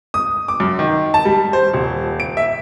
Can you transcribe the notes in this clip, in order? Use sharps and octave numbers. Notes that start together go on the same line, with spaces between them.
D#6
D6
F#2
D#3
A5
G3
C5
D#1
D7
E5